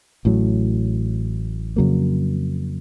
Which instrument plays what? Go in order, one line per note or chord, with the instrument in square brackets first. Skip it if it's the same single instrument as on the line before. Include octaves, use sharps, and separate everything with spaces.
[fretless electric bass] A1 A2 F#3
F2 C#3 F#3 A#3